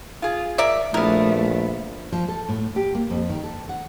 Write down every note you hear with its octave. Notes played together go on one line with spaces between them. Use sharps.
F4 G#4
A#4 D5 E5
A#1 A3 B3 E4 A#4
F3
A4
A2
G4
A#3
F2
D#3
A4
F#5